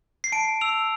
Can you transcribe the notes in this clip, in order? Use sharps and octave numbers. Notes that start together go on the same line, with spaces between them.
C7
A5 D7
E6 F7